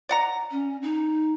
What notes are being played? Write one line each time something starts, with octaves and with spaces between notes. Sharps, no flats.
D5 F#5 A#5
C#4
D#4